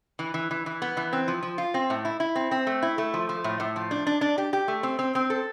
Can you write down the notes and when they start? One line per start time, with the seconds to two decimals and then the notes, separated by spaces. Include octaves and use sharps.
0.19 E3
0.34 E3
0.51 E3
0.66 E3
0.82 B3
0.97 E3
1.13 C4
1.28 F3
1.43 F3
1.58 F4
1.74 C4
1.90 A2
2.05 E4
2.20 E4
2.35 C4
2.51 C4
2.67 A3
2.82 E4
2.98 A3
3.14 F3
3.29 F3
3.44 A2
3.60 A2
3.76 F3
3.91 D4
4.07 D4
4.21 D4
4.38 G4
4.53 G4
4.68 A3
4.83 C4
4.99 C4
5.15 C4
5.30 A4